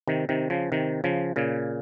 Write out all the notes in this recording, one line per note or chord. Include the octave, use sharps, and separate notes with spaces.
C3 D#3
C3 D#3
C#3 F3
C3 D#3
C#3 F3
A#2 C#3